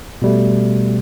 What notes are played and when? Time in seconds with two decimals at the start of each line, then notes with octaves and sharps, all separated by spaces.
0.22 B2 G3 A3